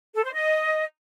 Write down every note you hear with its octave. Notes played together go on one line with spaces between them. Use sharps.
A4
C5
D#5